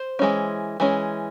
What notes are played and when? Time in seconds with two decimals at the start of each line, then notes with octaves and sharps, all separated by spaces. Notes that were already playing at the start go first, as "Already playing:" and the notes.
Already playing: C5
0.19 E3 G#3 C#4
0.80 E3 G#3 C#4